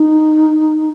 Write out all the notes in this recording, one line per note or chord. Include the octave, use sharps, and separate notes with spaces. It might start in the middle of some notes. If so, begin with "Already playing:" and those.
Already playing: D#4